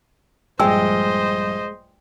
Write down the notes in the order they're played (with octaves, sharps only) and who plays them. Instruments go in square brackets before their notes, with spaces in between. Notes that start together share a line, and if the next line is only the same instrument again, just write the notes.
[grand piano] A#1 G2 [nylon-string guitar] G#3 [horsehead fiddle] C5 D#5 [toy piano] G5 E6